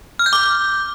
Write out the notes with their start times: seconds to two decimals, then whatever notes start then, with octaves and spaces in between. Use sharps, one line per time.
0.19 F6
0.26 G6
0.33 D6